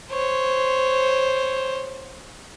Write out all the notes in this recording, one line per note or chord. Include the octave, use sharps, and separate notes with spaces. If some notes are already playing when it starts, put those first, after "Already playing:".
C5 C#5